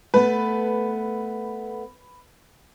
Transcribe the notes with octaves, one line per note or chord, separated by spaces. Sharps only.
A3 B3 B4